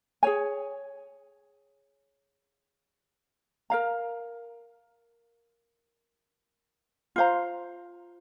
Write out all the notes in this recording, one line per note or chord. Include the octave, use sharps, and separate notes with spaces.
G#4 C#5 G#5
A#4 F5 A#5
F4 C5 F5 A#5